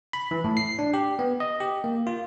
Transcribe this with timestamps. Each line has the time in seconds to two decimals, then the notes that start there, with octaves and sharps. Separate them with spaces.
0.13 B5
0.31 E3
0.44 A2
0.57 C7
0.79 D4
0.94 G4
1.19 B3
1.40 D#5
1.60 G4
1.84 A#3
2.07 F4